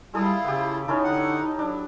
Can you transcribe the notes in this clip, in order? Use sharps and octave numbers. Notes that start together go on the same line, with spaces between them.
G3 G#3 E4 F4 A4 D#6
C#3 B3 G4
C#4 D#4 E4 A4
D3 F#5
F#3 D4